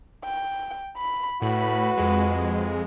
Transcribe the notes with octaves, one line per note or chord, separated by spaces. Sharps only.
G5
B5
A2 F#4 B4 B5
F2 G#3